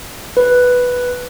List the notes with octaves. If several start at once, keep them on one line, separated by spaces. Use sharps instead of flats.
B4